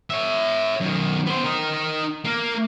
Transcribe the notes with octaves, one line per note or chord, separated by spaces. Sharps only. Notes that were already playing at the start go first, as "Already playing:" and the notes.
C#5 E5
F#2 D#3
B3 C5
D#4 A#4
A#3 A#4